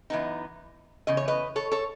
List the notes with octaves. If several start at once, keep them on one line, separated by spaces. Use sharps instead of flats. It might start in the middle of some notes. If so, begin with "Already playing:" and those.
F#2 E3 B3 D#4
E2 C#3 D#5
C#5
B4 D#5
A4 C#5
A4 C#5